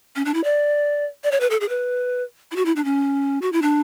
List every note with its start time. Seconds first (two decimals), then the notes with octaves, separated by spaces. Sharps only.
0.16 C#4
0.25 D4
0.34 E4
0.44 D5
1.24 D5
1.31 C#5
1.40 B4
1.50 A4
1.61 G#4
1.69 B4
2.51 E4
2.56 F#4
2.65 E4
2.76 D4
2.85 C#4
3.42 F#4
3.52 E4
3.62 D4